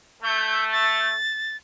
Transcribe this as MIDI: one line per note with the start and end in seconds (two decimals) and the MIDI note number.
0.23 1.14 57
0.23 0.65 91
0.72 1.56 93